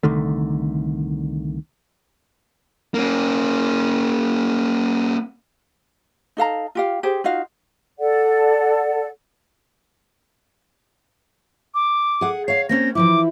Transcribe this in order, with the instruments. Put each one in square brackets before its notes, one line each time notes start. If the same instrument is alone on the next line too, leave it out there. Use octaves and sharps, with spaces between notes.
[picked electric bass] C2 D3 D#3 A3
[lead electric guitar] A#3 C#4
[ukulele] D#4 A4 F5 A#5
F4 G4 F5
G4 G#4 C5
D#4 F4 F#4 F5
[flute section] A4 D5 F#5
[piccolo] D6
[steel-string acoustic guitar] G#4 F#5
[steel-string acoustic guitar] C#5 F5 [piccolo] C7
[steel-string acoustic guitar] A#3 C4 C#4 [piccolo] A#6
[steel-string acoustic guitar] E3 F3 E4 [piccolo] D6